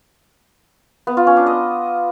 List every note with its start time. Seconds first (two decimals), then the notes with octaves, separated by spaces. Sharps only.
1.07 B3
1.17 F4
1.27 C#4
1.37 D4
1.46 D#5